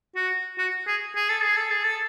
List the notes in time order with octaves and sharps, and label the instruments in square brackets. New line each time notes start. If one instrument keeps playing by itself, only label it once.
[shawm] F#4
F#4
G#4
G#4
A4
G#4
A4
G#4
A4